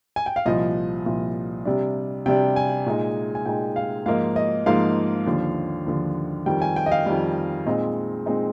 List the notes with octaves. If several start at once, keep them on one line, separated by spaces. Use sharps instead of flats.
G#5
G5
F5
C2 A#2 F3 D#5
C2 A#2 F3
C3 G3 D4
C3 G3 D4 G5
G#5
A#2 G#3 D#4
G#5
A#2 G#3 D#4 G5
F5
G#2 F3 A#3 D#4 F5
D#5
G#2 F3 A#3 D#4 F5
D#2 D3 F3
D#2 D3 F3
F2 D#3 G3 G5
G#5
G5
D#5
F5
F2 D#3 G3
A#2 G#3 C4 D#4 D#5
A#2 G#3 C4 D#4